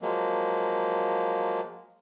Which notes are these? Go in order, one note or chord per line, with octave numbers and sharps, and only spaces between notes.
F3 F#3 G#3 A#3